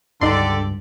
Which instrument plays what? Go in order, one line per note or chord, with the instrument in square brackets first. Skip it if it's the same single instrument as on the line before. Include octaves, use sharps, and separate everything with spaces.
[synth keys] C#2 G2 [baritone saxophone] D3 [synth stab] D#4 C6 [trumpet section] G4 A4 D5